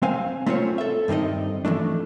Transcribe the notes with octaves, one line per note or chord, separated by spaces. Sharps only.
C4 C5 F5 G#5
A3 C4 C#4 F4 C5 C#5
A4 E5
G2 D#3 C4 D#4 D#5
E3 F3 A3 D4